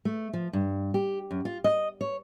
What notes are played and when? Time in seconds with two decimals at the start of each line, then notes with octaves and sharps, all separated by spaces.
0.05 A3
0.33 F3
0.53 G2
0.94 G4
1.31 F#2
1.45 F4
1.64 D#5
2.01 C#5